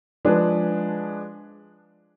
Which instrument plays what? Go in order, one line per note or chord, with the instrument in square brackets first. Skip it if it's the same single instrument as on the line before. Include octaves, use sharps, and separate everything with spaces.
[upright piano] F3 G#3 D4 G#4 B4